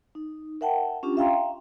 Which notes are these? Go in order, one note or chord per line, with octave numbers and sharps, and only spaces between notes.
D#4
A#4 E5 F#5 G5 A5
C#4 D4 F4 G4
E5 F5 G5 A#5 C6